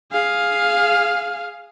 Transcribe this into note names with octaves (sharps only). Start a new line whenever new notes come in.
G#4 F5